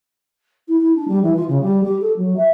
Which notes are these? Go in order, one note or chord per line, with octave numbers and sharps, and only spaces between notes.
E4
E4
D4
G3
E3
F4
C#3
G3
G4
A4
F#3
E5